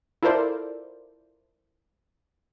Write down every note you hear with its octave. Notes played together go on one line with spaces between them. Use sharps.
E4 F4 A4 A#4 C5 D5